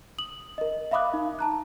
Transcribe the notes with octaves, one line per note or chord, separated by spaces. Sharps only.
D#6 F#7
A#4 D#5
E5 F5 B5 D6 D#6 F#6
D#4
A5 A#5 F#6